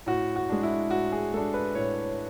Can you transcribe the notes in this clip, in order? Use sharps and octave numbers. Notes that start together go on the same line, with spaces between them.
A2 F#4
F#4
G#3 D4
E4
A2 F#4
G#4
G#3 D4 A4
B4
A2 C#5